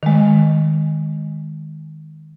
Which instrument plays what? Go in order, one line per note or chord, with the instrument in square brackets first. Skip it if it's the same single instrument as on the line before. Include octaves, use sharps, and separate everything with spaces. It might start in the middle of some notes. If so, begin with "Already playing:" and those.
[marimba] D#3 G#3